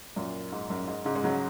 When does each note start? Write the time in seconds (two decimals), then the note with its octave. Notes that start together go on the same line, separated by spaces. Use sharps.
0.16 F#2 A#2
0.52 G#2
0.70 F#2
0.88 G#2
1.05 G#2 C#3
1.15 G#3
1.23 C#3 F#3